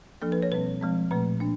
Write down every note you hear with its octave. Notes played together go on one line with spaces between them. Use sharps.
F3 A#3 D4 A4
B4
C#5
B2 G3 C4 B4
F3 G#3 C4
A#2 F3 A3 B4
A#3 D4